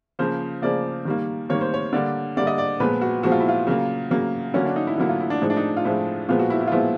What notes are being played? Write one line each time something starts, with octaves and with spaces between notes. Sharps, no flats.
C#3 F3 A#3 C5
C#3 F3 A#3 D5
D#3 G3 A#3
D#3 G3 A#3 C#5
C5
C#5
D3 G3 A#3 D5
D3 G3 A#3 D5
D#5
D5
A#2 F3 G#3 B3 B4
F#4
A#2 F3 G#3 B3 F#4
F4
E4
F4
C#3 F#3 A#3
C#3 F#3 A#3
D3 F#3 A#3 C#4
D4
D#4
E4
D3 F#3 A#3 E4
F4
E4
D4
A2 F3 G#3 D#4
D4
D#4
F4
A2 F3 G#3 E4
A#2 F3 G#3 B3 F4
F#4
E4
E4
F4
A#2 F3 G#3 B3 E4